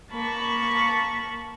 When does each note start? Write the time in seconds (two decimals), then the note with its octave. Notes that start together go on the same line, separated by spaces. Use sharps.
0.11 A#3 A5 B5 C#6